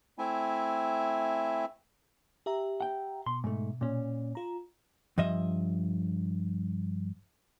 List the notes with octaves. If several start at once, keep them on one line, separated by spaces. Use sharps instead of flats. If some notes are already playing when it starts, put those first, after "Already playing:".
A3 C4 E4 E5 G#5
G4 E5 A#5
F#5 G5
B2 C6
G#2 A3
A#2 C#4
F4 A#5
G2 F3 D#5 E5